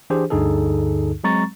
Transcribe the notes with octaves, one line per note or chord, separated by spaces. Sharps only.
E3 D4 G4 G#4 C5
D2 G2 D3 D#4 G#4 A4
F#3 G#3 C4 A#5 C#6 A6